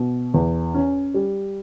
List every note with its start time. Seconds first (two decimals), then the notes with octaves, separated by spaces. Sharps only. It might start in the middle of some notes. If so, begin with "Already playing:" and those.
Already playing: B2
0.34 E2
0.74 C#4
1.14 G3